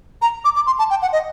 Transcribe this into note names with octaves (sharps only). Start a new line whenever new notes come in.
A#5
D6
D6
C6
A5
G5
F#5
D#5